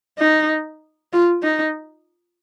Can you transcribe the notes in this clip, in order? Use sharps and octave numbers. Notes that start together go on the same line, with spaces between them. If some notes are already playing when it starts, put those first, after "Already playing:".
D#4
F4
D#4